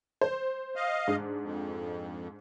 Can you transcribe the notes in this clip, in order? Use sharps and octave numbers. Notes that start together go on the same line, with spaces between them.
C5
D#5 F5
G#2 D4
F2